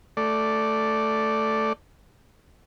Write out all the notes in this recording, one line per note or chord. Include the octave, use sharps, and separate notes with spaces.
A3 D5